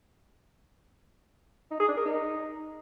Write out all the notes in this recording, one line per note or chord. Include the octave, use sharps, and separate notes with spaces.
D#4
G#4
D4
A#4
D#4